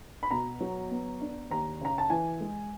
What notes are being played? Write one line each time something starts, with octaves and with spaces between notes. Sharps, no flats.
B5
B2 A#5
F#3
B3
D4
D#2 A#5
C#3 A#5
A5
E3 G#5
G#3